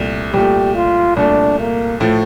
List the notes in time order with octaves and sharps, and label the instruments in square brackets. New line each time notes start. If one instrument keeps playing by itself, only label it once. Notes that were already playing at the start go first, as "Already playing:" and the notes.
Already playing: [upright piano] C2 A#2 A3
[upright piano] C2 A#2 A3 [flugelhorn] G4
[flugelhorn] F4
[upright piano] C2 A#2 A3 [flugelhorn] D4
[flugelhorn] A#3
[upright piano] A2 F3 A3